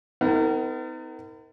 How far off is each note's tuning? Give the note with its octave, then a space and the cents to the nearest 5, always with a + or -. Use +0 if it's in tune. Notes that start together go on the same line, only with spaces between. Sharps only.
B3 +40 D#4 +40 A#4 -30